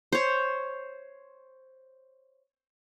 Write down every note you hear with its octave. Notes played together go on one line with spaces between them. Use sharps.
C5 C#5